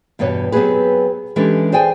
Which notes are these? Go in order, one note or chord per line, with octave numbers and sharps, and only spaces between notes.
E2 G2 B2 B3 C#5
F#3 B3 C4 G4 G#4 B4
E3 G#3 C#4 D4 G4 A4
G#4 C5 D5 G5 G#5